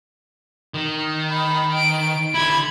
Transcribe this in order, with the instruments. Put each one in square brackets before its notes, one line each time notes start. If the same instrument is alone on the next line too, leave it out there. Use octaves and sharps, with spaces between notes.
[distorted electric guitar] D#3
[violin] B5
D7
[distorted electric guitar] D3 E4 [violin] B5 G#6